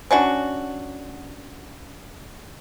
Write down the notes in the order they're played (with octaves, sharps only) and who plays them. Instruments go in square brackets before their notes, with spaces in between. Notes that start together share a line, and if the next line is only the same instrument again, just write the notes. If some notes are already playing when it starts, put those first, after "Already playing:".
[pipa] C#4 D4 F#4